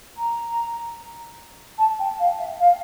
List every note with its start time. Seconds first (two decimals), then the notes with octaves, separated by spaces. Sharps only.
0.18 A#5
1.78 A5
1.99 G5
2.19 F5
2.39 E5
2.60 F5